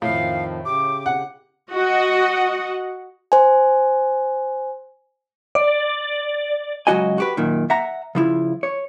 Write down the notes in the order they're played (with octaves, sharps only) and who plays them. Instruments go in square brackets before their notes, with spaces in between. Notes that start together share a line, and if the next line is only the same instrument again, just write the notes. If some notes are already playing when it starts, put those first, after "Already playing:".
[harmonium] F2 D#3 F3 [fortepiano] A2 [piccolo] F5
[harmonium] C#3 G4 [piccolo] D6
[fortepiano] F#5
[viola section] F#4 D#5 F#5
[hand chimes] C5 G#5
[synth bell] D5
[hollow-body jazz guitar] C#2 C3 F#3 F#4 D#5 G#5
F#4 G4 B4
F#2 A#2 D#3
E5 F#5 A#5
C#3 F3 E4
C#5